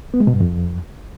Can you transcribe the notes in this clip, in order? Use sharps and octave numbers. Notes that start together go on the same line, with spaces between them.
B3
G#3
B2
G2
F2